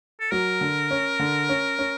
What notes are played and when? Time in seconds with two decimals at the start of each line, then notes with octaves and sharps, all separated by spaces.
0.20 A4
0.31 F#3 A#4
0.61 D3
0.91 C#4
1.19 D3
1.49 C#4
1.79 C#4